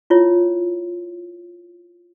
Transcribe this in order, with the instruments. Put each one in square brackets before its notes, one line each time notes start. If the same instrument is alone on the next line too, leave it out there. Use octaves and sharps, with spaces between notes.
[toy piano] E4 F4 C#5